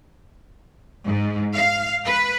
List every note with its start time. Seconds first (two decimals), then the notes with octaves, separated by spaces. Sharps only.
1.06 G#2
1.54 F5
2.05 B4